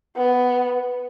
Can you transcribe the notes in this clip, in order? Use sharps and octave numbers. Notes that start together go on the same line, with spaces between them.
B3